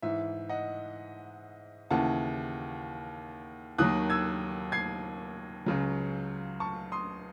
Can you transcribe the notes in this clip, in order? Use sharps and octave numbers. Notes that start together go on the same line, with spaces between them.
G#2 E3 E5
D#5 F#5
D#2 C#3 E3 F#5 A5
D#2 D#3 F#3 D#6 F#6
E6 G#6
G#6 C7
C#2 C#3 F#3
A5 C#6
C6 D#6